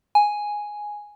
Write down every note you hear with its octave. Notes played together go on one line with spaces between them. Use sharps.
G#5